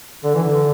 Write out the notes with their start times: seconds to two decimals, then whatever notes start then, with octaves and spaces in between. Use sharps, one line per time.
0.24 D3
0.35 E3
0.44 D3